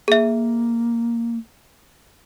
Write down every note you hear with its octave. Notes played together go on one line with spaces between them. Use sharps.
A#3 G#4 E5